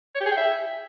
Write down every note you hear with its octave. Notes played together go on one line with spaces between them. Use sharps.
C#5
G4
G#4
G5
E5